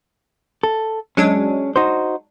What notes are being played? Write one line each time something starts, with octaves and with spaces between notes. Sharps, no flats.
A4
F#3 G#3 C#4 D4
D#4 F#4 C5